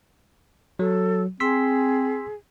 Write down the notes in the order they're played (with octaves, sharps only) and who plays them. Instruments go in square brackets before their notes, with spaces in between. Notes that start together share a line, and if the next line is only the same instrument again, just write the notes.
[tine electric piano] F#3 [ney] A4
[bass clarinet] C4 [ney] G#4 [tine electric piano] C6 E6 B6